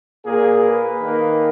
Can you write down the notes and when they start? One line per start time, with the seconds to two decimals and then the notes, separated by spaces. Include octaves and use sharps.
0.25 A#2 A#3 G#4
0.63 B4
1.01 D#3 A#3